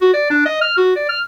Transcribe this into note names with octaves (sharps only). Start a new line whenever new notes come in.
F#4
D5
D4
D#5
F6
F#4
D5
F6